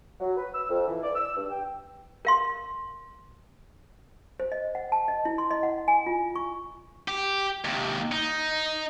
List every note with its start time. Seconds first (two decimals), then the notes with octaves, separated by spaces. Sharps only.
0.20 F#3
0.36 B4
0.54 E6
0.69 F2
0.87 E3
1.03 D5
1.16 E6
1.36 G2
1.50 G5
2.25 A#4 F5 C6
4.40 C5
4.52 D#5
4.75 F#5
4.92 A5
5.08 D#5
5.25 E4
5.38 C6
5.51 D#5
5.63 F#5
5.88 G#5
6.06 F4
6.36 C#6
7.08 G4
7.65 D#2 C3
8.12 D#4